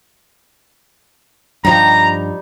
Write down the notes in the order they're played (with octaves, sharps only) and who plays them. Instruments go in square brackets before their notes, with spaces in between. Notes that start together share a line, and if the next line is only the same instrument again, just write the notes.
[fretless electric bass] G2 F3 [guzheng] G3 D#4 [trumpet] A#5